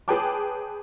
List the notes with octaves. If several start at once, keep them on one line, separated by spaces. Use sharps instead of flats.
G#4 B4 C#5 G5 A5 D6